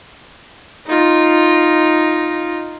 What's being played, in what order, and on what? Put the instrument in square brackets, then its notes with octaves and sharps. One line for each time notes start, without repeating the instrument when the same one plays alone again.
[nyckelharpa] D#4 F4